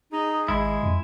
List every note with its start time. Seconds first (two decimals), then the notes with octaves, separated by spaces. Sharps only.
0.12 D#4 G#4
0.48 G#1 G#3 E4
0.83 F2